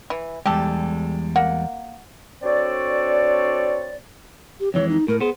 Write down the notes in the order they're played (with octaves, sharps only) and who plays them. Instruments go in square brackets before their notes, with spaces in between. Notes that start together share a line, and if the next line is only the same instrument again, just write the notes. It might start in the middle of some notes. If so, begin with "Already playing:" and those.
[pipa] E3
[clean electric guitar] E2 G3 G#3 [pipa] G4 A4
[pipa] A#3 [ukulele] F#5
[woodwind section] C4 D4 F#4 A4 C#5 D5
[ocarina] G4
[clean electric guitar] F2 E3 G#3 [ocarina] C#5
[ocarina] D#4
[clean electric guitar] A2 [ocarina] A#4
[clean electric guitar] B3 C5 [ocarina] G#4